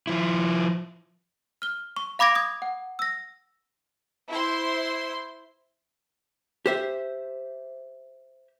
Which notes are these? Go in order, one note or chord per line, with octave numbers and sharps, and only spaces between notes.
F3 E4
F6 G7
C#6
F5 B5 D6 G#6 A#6 D7
D#6 G#6
F#5
E6 A#6
E4 C5 C6
G4 C5 E5